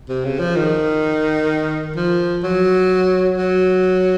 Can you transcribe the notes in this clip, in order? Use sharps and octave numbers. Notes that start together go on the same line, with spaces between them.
C3
C#3
F3
D#3
F3
F#3
F#3